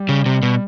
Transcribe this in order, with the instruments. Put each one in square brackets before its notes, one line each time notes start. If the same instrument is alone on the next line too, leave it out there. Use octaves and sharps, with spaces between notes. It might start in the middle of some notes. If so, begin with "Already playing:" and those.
Already playing: [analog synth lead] G3
[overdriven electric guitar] C#3
C3
B2